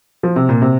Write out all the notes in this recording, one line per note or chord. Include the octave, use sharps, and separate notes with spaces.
F3
C3
A#2
C3